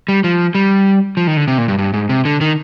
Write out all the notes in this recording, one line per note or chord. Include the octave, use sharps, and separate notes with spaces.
G3
F3
G3
F3
D#3
D3
C3
A#2
G2
G2
G#2
C3
D3
D#3